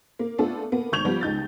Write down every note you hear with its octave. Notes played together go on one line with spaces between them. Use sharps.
A#3
A3 B3 D4 F4 A4
A#3 B3
G#1 C#6 G6 G#6 F7
F3 G3 B3
C#2 D#4 G6 A6